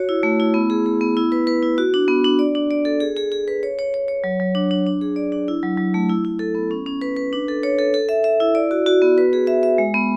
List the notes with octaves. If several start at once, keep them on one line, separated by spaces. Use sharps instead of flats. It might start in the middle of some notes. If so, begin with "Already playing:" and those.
Already playing: F#4 C#5
E4
A3
E4
B3
G#4
G#4
B3
E4
B4
B4
E4
F#4
D4
B3
D4
D5
D4
D5
A4
G#4
G#4
G#4
B4
C#5
C#5
C#5
C#5
F#3
F#3
D4
D4
D4
G#4
D5
D4
E4
F#3
F#3
A3
E4
E4
A4
B3
C#4
C#4
B4
B4
D4
A4
C#5
A4
A4
E5
E5
E4
D5
F#4
F#4
B3
B4
G#4
E5
E5
G#3
B3